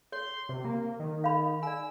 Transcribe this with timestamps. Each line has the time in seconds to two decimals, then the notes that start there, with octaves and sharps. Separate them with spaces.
0.12 C#5 C6
0.49 C3
0.65 A#3
0.99 D#3
1.24 F5 B5
1.63 D5 G#5 E6